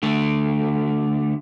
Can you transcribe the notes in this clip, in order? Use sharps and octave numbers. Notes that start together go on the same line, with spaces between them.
D3 A3